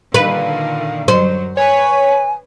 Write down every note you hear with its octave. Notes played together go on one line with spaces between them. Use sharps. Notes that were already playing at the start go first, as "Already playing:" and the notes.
A#2 D3 D#3 B4 F5
F#2 F#3 C5
B4 C#5 G#5